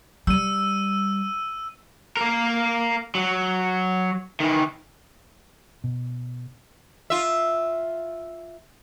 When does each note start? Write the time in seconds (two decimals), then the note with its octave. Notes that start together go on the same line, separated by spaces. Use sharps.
0.27 G3 E6 D#7
2.17 A#3 A#4
3.15 F#3
4.40 D#3 E3
5.84 B2
7.10 F4 E5